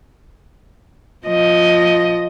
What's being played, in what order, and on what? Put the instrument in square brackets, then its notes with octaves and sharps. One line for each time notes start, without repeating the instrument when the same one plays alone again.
[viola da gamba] F3 D#5